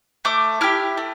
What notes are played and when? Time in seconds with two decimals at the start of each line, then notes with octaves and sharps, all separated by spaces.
0.25 A3 D6
0.61 E4 G4 F6
0.97 A3